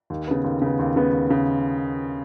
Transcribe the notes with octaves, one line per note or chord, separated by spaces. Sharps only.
D#2
C#3 B3
D#2
C#3 B3
D#2
C#3 B3
D#2
C#3 B3